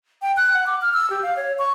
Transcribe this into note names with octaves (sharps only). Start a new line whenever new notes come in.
G5
F#6
F#5
D6
F6
E6
G4
F5
C#5
C#6